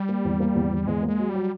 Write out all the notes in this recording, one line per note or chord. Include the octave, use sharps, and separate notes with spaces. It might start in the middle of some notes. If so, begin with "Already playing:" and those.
Already playing: G3
A#3
E2
A#3
E2
E2
E2 G#3
A#3
G#3
F#3
G3
F#3